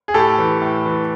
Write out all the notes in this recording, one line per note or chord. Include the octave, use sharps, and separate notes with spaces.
G#4
A2 G4 A4
E3
A2
E3